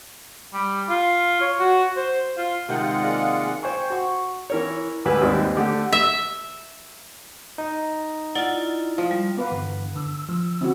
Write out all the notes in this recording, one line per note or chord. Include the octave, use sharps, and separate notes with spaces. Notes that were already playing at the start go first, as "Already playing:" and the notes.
G3
F4
C#5
F#4
C5
F4
C3 D#3 G#3 F4 F#5
A#3 G#4 D5
C5 G5 G#5 C#6
F#4 C#6
E3 A#4 C#5
D2 G#2 G4 B4 G#5 E6
D#2 G#2 G3 C4 D5
D3 A3 G4
E5
D#4
E4 F4 D5 F#5 A6
F3
G3
B3 B4 F5 A#5 D6
G2 D3 E3
D3 E6
F3
D3 C4 C#4 E4 F#4